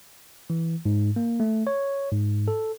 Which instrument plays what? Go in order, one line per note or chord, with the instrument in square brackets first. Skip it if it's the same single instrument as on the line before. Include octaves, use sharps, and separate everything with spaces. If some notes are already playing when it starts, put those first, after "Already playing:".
[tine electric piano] E3
G#2
A#3
A3
C#5
G#2
A4